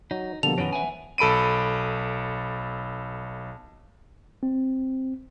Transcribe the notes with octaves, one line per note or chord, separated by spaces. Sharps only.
F#3 D#4
B2 D3 F3 G3 A#3 A4 F7
F#2 D#3 E3 B3 C#4 D7
E5 F#5 G#5
B1 A4 B5 D7 D#7
C4